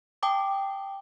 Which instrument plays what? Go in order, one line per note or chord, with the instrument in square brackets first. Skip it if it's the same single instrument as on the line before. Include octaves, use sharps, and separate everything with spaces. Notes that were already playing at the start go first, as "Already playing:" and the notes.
[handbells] G5 A5 D6 D#6